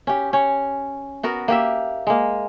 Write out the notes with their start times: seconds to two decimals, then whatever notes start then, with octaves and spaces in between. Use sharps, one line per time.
0.07 C#4 G4
0.33 C#4 C#5
1.23 B3 F#4 A#4
1.48 A#3 G4 E5
2.07 G#3 A#3